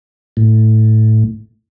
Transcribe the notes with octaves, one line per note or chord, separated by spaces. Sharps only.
A2